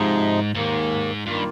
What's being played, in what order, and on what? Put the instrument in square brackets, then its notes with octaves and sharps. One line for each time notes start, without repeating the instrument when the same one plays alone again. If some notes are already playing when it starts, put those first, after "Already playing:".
Already playing: [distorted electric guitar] G#2 [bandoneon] C3 F3 G#3 D#4
[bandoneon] D#2 D#3 A#3 [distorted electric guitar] G#2
[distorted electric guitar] G2 [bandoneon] D#3 A#3 F4